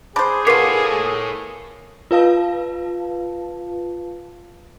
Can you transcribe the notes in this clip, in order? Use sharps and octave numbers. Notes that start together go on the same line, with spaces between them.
D4 G#4 C5 B5
B3 F4 A4 A#4 C#5 D6 C7
F4 B4 F5 A5